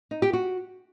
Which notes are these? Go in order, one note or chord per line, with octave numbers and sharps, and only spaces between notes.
D#4
G4
F#4